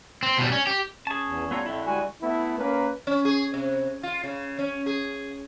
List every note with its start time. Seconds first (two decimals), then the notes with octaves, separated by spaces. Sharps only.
0.23 C4
0.38 B2 G3
0.52 C#4
0.67 G4
1.07 C#4 G#4 A5
1.26 E2
1.51 G3 B3 F4 A4 C#5 A#5
1.66 F2 D3 A3 E4
1.86 G3 G#3 F#4 G#5
2.22 A3 B3 E4
2.59 A#3 C#4 A#4 B4
3.07 C#4
3.25 G#4
3.54 C3
4.03 F4
4.24 C#3
4.59 C#4
4.86 G#4